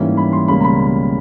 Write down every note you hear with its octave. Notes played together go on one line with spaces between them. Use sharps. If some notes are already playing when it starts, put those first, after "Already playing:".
Already playing: G#2 E3 G3 A#3 C#4
B5
C6
C#2 B2 G3 A#3 C#4 B5
A#5
B5